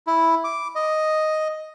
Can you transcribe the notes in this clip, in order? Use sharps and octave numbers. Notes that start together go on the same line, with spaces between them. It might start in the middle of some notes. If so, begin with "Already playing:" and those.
E4
D6
D#5